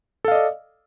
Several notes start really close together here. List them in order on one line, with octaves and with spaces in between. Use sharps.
A4 F5 D#5 D5